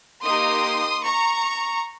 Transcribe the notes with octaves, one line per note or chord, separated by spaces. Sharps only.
A#3 D#4 G4 C6 D#6
A#5 C#6